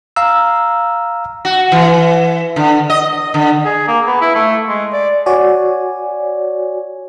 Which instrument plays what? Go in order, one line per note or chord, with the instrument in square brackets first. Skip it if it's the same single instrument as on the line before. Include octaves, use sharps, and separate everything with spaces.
[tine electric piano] F5 A#5 E6
[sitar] F#4
E3
D3
D#5
D3
[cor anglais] G#4
A#3
B3
E4
A3
G#3
D5
[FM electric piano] F#4 C#5 D5 G#5